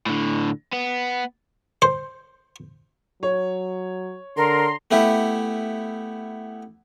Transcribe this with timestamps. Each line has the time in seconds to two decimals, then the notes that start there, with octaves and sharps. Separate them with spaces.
0.06 A2 D3
0.73 B3
1.82 C5
3.23 F#3 C#5
4.37 D3 A#4 A#5 C6
4.91 A3 B3 E4 G4